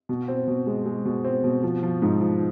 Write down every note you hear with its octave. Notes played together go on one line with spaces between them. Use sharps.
B2
C4
B2
G#3
G#3
B2
C4
B2
F3
F3
G#2
F3